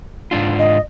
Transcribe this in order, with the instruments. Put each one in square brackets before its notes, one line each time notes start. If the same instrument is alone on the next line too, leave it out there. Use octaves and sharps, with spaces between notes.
[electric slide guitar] G#2 D4 F4
[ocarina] D#5